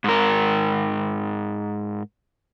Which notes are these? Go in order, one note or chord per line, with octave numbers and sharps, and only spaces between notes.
G#2 A#4